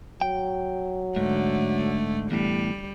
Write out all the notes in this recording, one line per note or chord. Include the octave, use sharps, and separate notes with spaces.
F#3 G5
G#2 D3 A3
E2 A2 G3